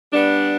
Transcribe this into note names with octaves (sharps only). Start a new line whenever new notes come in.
G3 B3 D4